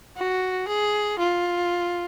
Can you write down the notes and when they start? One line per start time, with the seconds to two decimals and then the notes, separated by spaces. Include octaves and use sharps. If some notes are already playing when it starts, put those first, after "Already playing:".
0.17 F#4
0.68 G#4
1.19 F4